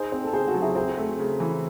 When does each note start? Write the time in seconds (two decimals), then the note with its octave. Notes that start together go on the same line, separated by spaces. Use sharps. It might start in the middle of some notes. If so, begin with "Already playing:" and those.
Already playing: D#4 G#4 C5
0.12 C4
0.24 A4
0.33 C#3 G#4 C5
0.48 F#4 A4
0.54 F#3
0.61 E4 G#4
0.75 C4 G#4 C5
0.97 A3
1.19 C#3
1.40 E3